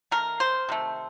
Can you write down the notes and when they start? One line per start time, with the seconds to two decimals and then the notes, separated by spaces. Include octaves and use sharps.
0.11 D#3 A3 A#4
0.40 C5
0.69 C3 D#3 A3